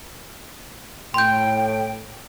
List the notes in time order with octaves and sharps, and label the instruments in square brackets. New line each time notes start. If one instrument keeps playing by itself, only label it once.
[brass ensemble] A2 [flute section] G5 [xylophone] C6 G6